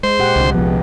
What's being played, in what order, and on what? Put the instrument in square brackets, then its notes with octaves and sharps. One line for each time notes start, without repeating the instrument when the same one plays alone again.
[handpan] G#3 [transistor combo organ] C5
[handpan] A#2 G4 F#5
[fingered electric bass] C2 D3
[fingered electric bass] C2 F3 [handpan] B3